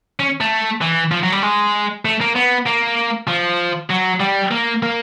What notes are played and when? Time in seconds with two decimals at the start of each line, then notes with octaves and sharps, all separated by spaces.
0.20 C#4
0.41 A3
0.81 E3
1.12 F3
1.23 F#3
1.32 G3
1.43 G#3
2.05 A3
2.21 A#3
2.35 B3
2.66 A#3
3.28 F3
3.90 F#3
4.20 G3
4.51 A#3
4.83 A#3